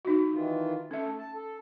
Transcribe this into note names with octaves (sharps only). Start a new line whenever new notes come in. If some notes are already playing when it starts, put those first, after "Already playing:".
D#4 F#4
D#3 E3 F4
A3 C#4 A4 E5
A5
A4